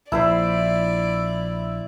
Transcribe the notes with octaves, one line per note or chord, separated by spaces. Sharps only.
A#1 E4 B4 C5 D5